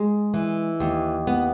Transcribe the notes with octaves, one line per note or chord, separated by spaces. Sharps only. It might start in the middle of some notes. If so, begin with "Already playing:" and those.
Already playing: G#3
E3
D#2
B3